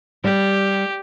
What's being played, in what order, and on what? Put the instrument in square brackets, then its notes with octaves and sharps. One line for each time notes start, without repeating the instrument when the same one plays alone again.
[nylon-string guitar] G3 [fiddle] G4